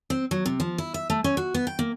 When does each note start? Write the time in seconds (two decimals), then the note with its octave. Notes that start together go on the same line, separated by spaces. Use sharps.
0.10 C4
0.31 F#3
0.46 C3
0.60 F3
0.78 E4
0.94 E5
1.10 A3
1.24 C#4
1.37 F#4
1.54 B3
1.67 G5
1.79 A#3